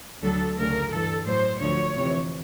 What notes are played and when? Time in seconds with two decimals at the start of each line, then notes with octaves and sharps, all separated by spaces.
0.22 D2 D3 F#3 A4
0.58 D2 C#3 F#3 A#4
0.91 G2 E3 A4
1.26 A2 F#3 C5
1.61 D2 D3 F3 C#5
1.95 F2 C3 E3